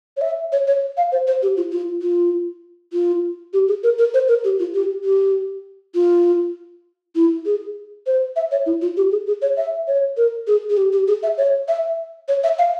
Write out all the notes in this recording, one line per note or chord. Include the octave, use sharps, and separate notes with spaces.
C#5
E5
C#5
C#5
F5
C5
C5
G4
F4
F4
F4
F4
G4
G#4
A#4
A#4
C5
A#4
G4
F4
G4
G4
F4
E4
G#4
C5
E5
C#5
E4
F4
G4
G#4
G#4
C#5
E5
C#5
A#4
G#4
G#4
G4
G4
G#4
E5
C#5
E5
C#5
E5
F5